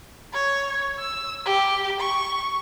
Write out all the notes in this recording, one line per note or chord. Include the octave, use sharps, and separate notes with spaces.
C#5
E6
G4
C#6